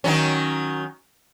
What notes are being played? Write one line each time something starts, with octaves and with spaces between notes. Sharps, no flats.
D#3 F#3 C#4